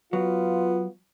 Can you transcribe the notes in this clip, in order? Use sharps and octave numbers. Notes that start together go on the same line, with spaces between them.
F#3 B3 F4